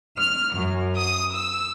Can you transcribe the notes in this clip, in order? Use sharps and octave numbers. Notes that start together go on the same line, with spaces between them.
F6
F#2
D#6
E6